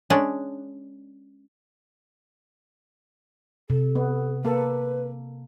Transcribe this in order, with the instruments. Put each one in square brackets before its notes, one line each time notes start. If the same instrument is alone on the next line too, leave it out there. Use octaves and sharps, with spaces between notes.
[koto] G#3 C#4 D4
[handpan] C3 [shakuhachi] A4
[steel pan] B3
[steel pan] A#3 A4 [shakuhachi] B4